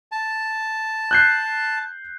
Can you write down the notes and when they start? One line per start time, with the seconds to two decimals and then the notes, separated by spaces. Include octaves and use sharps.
0.12 A5
1.11 F#6 G6 C7